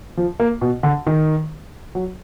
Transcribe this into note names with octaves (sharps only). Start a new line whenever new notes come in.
F3
A#3
B2
D3
D#3
F#3